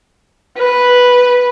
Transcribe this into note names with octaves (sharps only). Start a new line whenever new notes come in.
B4